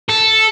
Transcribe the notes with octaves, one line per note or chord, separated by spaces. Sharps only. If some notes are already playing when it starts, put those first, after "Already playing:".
A4